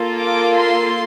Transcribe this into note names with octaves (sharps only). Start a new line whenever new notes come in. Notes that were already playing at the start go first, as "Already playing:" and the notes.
Already playing: A#3 F4 A4
D6
C6